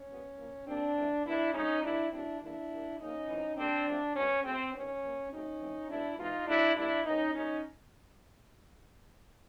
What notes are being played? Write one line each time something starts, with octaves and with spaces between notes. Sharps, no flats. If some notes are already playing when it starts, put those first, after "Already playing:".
Already playing: C#4
A#2 G3 B3
A#2 F3 A#3
A#2 G3 A#3 C4 D4
E3 A3 C4
D#3 G3 B3 D4 E4
D3 F3 G#3 C#4 D#4
D#3 G3 B3 D4 E4
C#3 F#3 A3 C4 D4 E4
C#3 E3 G3 A#3 D4 E4
A#2 G3 A#3
C#3 F3 A#3 C#4 D#4
E3 A3 C4
D3 G3 A#3 C4 D4
C3 F3 A3 C4
B2 G#3 B3 C#4
C#3 F#3 A3 C4
D#3 G3 B3 C#4
A#2 F3 A#3
C#3 F#3 A3 C4 C#4 D#4
A2 E3 G#3 C4
B2 G#3 B3 D4 E4
C3 E3 G#3 B3 D#4 F4
C#3 F#3 A3 D4 E4
D3 G3 A#3 D4 E4
D#3 G#3 B3 C#4 D#4
A#2 G3 A#3 C#4 D#4